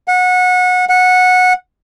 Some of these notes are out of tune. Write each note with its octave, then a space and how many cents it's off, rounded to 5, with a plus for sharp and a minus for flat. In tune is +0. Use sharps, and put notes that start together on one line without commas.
F#5 -25
F#5 -15